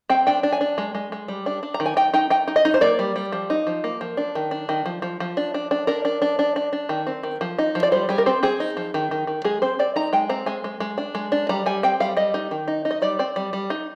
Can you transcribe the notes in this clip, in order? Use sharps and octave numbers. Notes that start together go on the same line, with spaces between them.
C4 G5
D4 G5
D4
G#5
D4
G#3
G#3
G#3
G3
D4
D4
A#5
D#3
G#5
D#4 G5
D#4 G5
D#4 G5
D#4
D#5
D#4
C5
A#3 D5
G3
G3
F3
D#4
F3
A#3
F3
D4
D#3
D4
D#3
F3
F3
F3
D4
D4
D4
D4 A#4
D4
D4
D4
D4
D4
D#3
C4
D#3
F3
D#4
F3
D5
G3 C5
G3 G#4
A#4
C4 C5
C4 G#4
D#4
F3
D#3
D#3
D#3
G#3 G#4
C4 C5
C4 D5
D#4 A#5
G#3 G5
C4 A#5
G#3 G#5
G#3
G#3
D4
G#3
D4
G3 A#5
G3 G#5
C4 G5
G3 F5
G3 D#5
D#4
D#3
D#4
D#4
D#5
G3 D5
C4 D5
G3
G3
D#4